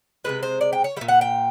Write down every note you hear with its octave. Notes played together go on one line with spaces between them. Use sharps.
C3 E3 G#3 B4
C5
D5
G5
C#5
A#2 G3 E5
F#5
G5